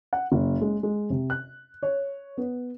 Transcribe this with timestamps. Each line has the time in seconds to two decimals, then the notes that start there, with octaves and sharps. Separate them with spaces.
0.13 F#5
0.32 F#1
0.61 G#3
0.83 G#3
1.10 C3
1.30 F#6
1.83 C#5
2.38 B3